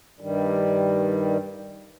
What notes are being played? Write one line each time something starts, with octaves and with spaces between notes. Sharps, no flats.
G2 D#3 G3